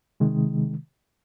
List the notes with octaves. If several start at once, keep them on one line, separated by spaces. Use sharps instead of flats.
C3 D#3 G#3